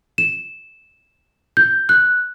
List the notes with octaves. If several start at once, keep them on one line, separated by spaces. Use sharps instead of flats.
E7
G6
F#6